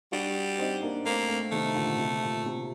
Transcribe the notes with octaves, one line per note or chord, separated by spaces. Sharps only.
G3 D4 F#4
C4 D#4
A#3 D4
A3 A#3 C4
A3 C4
C3 D#3 A3
A#2 D3
C3
A#2
C3